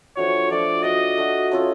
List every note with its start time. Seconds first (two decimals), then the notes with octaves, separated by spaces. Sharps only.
0.16 F3 A3 D4 F#4 C#5
0.50 F3 A3 D4 F#4 D5
0.83 A3 D4 F#4 D#5
1.17 A3 D4 F#4
1.51 A3 C#4 F4 A4